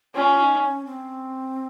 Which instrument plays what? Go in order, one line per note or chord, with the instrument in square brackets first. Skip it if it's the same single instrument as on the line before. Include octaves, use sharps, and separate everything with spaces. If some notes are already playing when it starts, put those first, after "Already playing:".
[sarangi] C#4 [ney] F4
[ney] D#4
C#4
C4